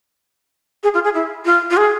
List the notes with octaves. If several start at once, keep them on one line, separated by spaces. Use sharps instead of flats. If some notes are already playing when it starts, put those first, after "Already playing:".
G#4
F4
G#4
E4
F4
F4
G#4